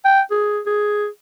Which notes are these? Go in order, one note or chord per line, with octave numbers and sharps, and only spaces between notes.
G5
G#4
G#4